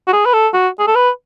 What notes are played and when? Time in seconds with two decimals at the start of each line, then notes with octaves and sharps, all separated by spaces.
0.07 F#4
0.13 G#4
0.25 B4
0.33 A4
0.53 F#4
0.79 G#4
0.87 A4
0.95 B4